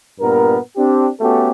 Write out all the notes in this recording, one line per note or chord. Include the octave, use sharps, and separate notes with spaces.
G2 A#2 B3 A#4
C4 D4 G4
A3 B3 C#4 F#4 G4 A4